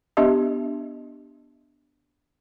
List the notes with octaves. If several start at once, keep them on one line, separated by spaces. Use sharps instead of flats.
B3 D4 G4 D#5 E5